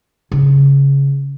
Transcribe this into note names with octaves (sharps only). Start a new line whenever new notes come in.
C#3